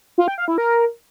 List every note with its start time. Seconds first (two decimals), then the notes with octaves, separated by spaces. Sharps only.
0.18 F4
0.28 G5
0.38 F5
0.48 E4
0.58 A#4